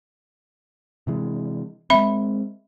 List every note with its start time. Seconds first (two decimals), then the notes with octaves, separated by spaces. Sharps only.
1.07 C3 E3 G#3
1.90 G#3 A3 C4 E5 B5